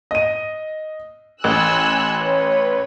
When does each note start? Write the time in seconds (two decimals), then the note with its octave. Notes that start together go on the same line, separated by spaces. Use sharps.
0.11 D#5 D#7
1.44 A1 G#5 E6 F#6
2.20 B4 C#5